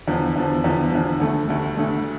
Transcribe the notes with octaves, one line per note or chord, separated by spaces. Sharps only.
E2 D3 F3
E2 D3 F3
E2 D3 F3
E2 D3 F3
D2 D3 A3
D2 D3 A3
D2 D3 A3